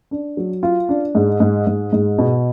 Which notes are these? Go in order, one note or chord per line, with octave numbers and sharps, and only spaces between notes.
D4
F#3
F4
D4
G#2
G#2
G#2
G#2
B2